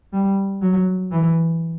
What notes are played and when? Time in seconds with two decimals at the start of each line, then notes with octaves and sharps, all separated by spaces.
0.13 G3
0.62 F#3
1.11 E3